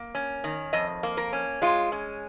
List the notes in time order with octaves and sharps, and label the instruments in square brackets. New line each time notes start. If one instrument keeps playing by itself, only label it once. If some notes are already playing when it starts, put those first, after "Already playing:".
Already playing: [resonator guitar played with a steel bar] A#3
C#4
D#3
F2 D#5
A#3
A#4
C#4
G#3 F4
C#4